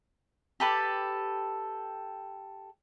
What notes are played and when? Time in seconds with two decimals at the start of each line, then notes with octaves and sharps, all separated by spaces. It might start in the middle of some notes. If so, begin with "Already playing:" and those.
0.60 G4 A4 B4 A5